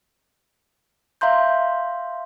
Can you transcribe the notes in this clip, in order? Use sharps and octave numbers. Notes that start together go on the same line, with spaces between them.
E5 F5 A#5 C6 G6